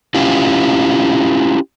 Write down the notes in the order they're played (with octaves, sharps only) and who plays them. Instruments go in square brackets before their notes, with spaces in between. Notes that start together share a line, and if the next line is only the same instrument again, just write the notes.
[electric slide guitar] C#4 E4 F4 G4